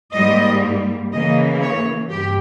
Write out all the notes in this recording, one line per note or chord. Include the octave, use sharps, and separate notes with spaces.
G#2 G3 A#3 D#5
C#3 E3 A#3 D#5
C#5
G2 G4